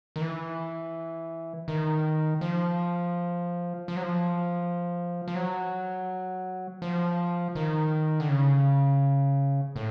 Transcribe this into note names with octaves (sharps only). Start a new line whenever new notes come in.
D#3
E3
D#3
F3
F3
F#3
F3
F3
F#3
F3
D#3
D3
C#3
A2